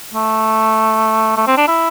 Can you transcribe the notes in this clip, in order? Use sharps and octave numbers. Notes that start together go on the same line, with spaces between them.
A3
A3
C4
D4
E4